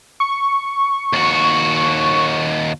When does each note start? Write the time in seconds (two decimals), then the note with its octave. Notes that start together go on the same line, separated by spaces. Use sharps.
0.20 C#6
1.13 D#2 F#4